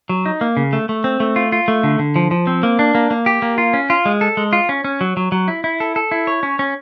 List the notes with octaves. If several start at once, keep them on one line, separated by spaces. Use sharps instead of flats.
F#3
D#4
A#3
C#3
A3
A3
C4
A3
F4
F4
A3
D3
D3
F3
F3
C4
A#3
D4
A#3
A#3
G4
A#3
F4
C#4
F4
G#3
A4
G#3
F4
C#4
C#4
F#3
F#3
F#3
E4
E4
A4
A4
E4
C#5
C#4
C#4